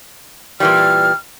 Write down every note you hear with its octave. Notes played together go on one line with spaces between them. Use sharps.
A#2 E3 G3 F6